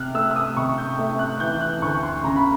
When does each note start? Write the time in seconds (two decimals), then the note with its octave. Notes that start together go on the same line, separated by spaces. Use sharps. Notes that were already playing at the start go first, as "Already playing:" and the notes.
Already playing: C3 F6 F#6
0.14 A3 E6
0.31 E6
0.36 D#6
0.57 C3 C#6
0.78 G6
0.99 A3
1.19 F#6
1.40 E3 G6
1.61 F#6
1.82 D2 C#6
2.03 C6
2.24 C#3 A#5
2.36 B5